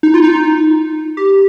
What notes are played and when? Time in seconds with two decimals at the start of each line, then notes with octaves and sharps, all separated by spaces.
0.03 D#4
0.14 F4
0.24 D#4
1.17 G4